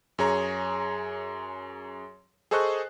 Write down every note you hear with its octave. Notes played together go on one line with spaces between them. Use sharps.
F#2 G#4 C#5 A#5
G#4 A4 C5 D#5 C#6 F#6